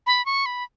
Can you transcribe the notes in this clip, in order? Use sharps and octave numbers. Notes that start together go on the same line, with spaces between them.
B5
C#6
B5